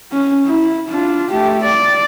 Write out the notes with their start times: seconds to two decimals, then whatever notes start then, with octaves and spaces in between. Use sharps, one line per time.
0.13 C#4
0.47 E4
0.88 D4 F4
1.31 A3 G4
1.63 D5